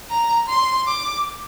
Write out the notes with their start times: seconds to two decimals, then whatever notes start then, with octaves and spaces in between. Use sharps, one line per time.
0.10 A#5
0.48 C6
0.87 D6